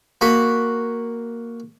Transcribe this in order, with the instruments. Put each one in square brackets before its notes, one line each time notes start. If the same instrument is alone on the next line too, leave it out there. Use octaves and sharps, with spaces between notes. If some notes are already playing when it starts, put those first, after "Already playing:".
[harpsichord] A#3 F#4 B5